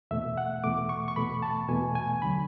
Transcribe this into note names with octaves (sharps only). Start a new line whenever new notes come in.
E2 B2 A3 E5
F#5
E2 B2 A3 D6
C#6
C#6
E2 B2 A3 B5
A5
E2 B2 A3 G#5
G#5
D2 D3 F#3 B5